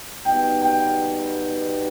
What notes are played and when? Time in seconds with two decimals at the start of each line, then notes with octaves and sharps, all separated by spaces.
0.25 B2 G3 B3 D#4 G5
0.62 G5